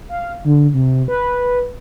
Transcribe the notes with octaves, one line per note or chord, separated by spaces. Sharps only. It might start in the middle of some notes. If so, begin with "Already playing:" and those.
F5
D3
C3
B4